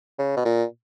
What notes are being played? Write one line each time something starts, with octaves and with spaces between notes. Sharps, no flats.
C#3
B2
A#2